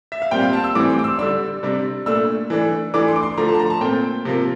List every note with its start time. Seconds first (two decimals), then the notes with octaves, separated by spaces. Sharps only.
0.12 E5
0.22 F5
0.31 A#2 G3 C4 G5
0.42 F5
0.53 A5
0.64 E6
0.75 A2 E3 G3 C4 D6
0.90 C6
0.99 D6
1.04 E6
1.18 D3 G3 D4 E6
1.63 C3 G3 D4
2.06 A#2 A3 D4 E6
2.50 E3 A3 D4
2.94 E3 A3 D4 D6
3.08 C6
3.16 D6
3.23 C6
3.37 D3 F3 A3 A#5
3.48 A5
3.55 C6
3.59 A#5
3.70 A5
3.81 A#2 A3 C4 G5
4.25 C3 F3 A#3